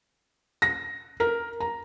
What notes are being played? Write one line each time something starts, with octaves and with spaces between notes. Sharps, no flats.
A#6
A#4
A#5